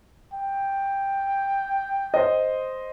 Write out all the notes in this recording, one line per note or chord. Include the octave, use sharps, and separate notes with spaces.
G5
C5 D#5